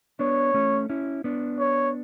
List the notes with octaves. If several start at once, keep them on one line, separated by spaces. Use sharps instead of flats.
B3 D4 C#5
A3 C#4
C#4 E4
B3 D4
C#5